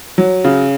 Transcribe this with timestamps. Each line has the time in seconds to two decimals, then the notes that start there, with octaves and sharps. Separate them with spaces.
0.18 F#3
0.45 C#3